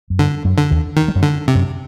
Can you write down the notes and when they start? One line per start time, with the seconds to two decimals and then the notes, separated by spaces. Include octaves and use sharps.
0.10 F#2
0.19 G2 D3
0.44 F#2 F#3
0.58 D3
0.71 D#2 D#3
0.97 D#3
1.08 G3
1.15 F#2 F#3
1.23 D3
1.48 C3
1.55 F#2 F#3